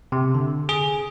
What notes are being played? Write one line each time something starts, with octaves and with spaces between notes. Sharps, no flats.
C3
D3
G#4